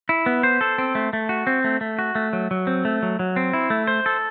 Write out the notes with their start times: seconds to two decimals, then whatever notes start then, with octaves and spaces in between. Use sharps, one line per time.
0.09 E4
0.26 B3
0.43 C5
0.61 A4
0.78 C4
0.95 A3
1.13 A3
1.29 F#4
1.47 C4
1.64 A3
1.81 A3
1.99 F#4
2.15 A3
2.33 F#3
2.51 F#3
2.67 C4
2.85 A3
3.03 F#3
3.19 F#3
3.36 C4
3.53 E4
3.70 A3
3.87 C5
4.06 A4